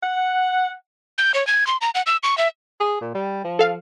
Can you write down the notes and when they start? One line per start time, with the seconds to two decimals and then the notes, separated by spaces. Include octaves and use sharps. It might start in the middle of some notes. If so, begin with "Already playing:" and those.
0.03 F#5
1.18 G6
1.34 C#5
1.47 G#6
1.67 C6
1.81 A#5
1.95 F#5
2.06 E6
2.23 C#6
2.38 E5
2.80 G#4
3.01 A#2
3.14 G3
3.44 F3
3.59 A4 F5